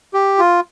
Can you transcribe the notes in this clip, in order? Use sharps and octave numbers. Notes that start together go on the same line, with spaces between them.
G4
F4